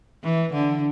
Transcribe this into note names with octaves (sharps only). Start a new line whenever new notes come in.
E3
D3